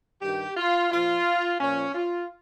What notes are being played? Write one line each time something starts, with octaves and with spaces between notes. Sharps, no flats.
G2 D#3 G4
F4
A#2 F3 F4
A#2 F3 C#4
F4